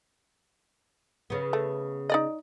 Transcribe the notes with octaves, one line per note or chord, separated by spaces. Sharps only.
C#3 B3
A3
D#4 D5 D#5